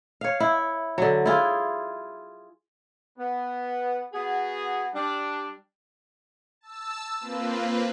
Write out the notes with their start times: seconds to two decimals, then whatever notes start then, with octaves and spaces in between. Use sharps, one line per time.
0.21 C#5 F5
0.40 E4
0.98 D3 F#3
1.26 E4 F4 G#4
3.18 B3
4.13 B3 F#4 G#4
4.94 G3 D4
6.61 A5 E6
7.20 A#3 C4 F4 B4